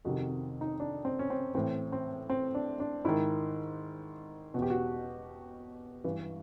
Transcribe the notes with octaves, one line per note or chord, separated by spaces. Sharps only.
F2 C3 D#3 F#4
D#4
D4
C4
C#4
C4
A2 E3 C4
C4
C4
D4
D4
G#2 D#3 E4
E2 B2 F#4 G4
F#4
G2 E3